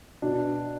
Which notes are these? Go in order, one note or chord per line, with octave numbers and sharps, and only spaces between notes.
B2 D4